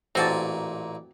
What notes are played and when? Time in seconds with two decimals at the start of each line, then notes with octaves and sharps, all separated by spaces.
0.15 A1 A#2 C4 F#4 G#5 A5